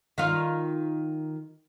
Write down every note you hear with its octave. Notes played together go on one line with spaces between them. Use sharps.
D#3 F4